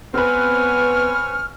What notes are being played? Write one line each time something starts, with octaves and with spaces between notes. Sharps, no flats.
B3 C4 B4 C#5 G#5 F6